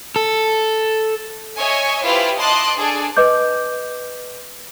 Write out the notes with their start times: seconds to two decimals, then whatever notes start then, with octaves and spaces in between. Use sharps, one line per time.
0.16 A4
1.59 C#5 D#5 E5 G#5 C#6
2.05 E4 F4 G4 B4 C5 F5
2.38 D#5 A5 C6 D6 F#6
2.77 D4 G#4 A4 D5
3.17 B4 D#5 D6 G6